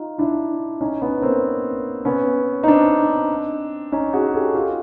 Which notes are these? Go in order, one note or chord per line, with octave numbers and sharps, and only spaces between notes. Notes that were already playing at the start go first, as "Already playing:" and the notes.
Already playing: D#4 F4
D4 E4
C#4 D#4
B3 C#4
A#3 C4
B3 C#4
D#4
C4 D4
C#4 D#4
F#4 G#4
G4 A4
F4 G4